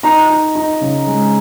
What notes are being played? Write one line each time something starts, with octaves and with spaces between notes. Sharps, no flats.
D#4 A#5
D#4
D#4
C#3
G#3